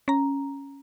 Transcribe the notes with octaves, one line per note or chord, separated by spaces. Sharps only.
C#4 A#5